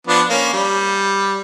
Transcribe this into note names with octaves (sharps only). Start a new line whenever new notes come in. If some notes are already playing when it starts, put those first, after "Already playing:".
F3 B3 D4
A#3 C#4
G3